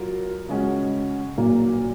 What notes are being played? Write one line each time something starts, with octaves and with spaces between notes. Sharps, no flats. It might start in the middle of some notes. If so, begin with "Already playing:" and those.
Already playing: F#3 F4 A#4
C#3 G#3 C#4 F#4
A#2 F#3 A#3